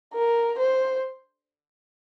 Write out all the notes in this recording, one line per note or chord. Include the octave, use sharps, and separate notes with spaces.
A#4
C5